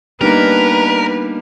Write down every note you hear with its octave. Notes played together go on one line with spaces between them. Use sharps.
G3 A#3 B3 D4 D#4 A#4 B4